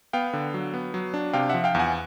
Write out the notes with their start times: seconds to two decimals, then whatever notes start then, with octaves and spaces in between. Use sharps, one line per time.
0.13 B3 F5 G5
0.33 D3
0.54 F#3
0.74 B3
0.94 F#3
1.14 D4
1.34 C3 F5 G5
1.49 F3 E5 F#5
1.64 F5 G5
1.75 E2 F#5 G#5